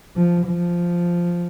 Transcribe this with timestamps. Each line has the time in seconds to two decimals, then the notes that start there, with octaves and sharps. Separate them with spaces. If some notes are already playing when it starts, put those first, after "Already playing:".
0.16 F3
0.47 F3